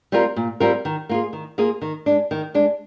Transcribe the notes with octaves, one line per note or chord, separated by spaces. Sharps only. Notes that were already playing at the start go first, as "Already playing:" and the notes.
G3 C4 F4 A#4
A#2
G3 C4 F4 A#4
D#3
A#3 F4 G#4
D#3
A#3 F4 G#4
D#3
G#3 D4
D#3
G#3 D4